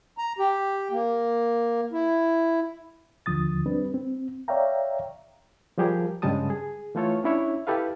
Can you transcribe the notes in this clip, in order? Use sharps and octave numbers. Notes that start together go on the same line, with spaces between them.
A#5
G4
A#3
E4
D#2 D3 F3 D#6 A6
G3 C4 D4 B4
C4
C#5 D5 E5 F5 G5 A#5
F3 G3 G4 G#4 A#4
G2 C#3 G3 G#3 A5 D#6
G#4
E3 A3 F4 A4 C#5
C#4 D4 E4 C#5 E5
E4 G4 A4 B4 F5